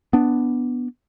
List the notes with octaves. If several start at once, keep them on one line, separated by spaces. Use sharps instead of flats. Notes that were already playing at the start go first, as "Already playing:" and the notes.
B3 D4